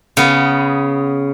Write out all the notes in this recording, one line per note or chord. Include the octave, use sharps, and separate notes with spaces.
C#3 B3